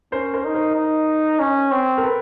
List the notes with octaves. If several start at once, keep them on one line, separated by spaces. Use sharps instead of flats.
C#4 A#4 C5
A#4 C5
D#4
A#4 C5
D#4
C#4
C4
A#4
A4 B4